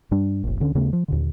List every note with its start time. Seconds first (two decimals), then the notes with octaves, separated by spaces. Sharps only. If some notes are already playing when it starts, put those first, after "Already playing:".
0.11 G2 G3 D4
0.44 F1 A#1
0.60 D2 D3 C#4
0.75 D#2 C#3 A3 B3
0.93 F3
1.08 D#2 A#2 D3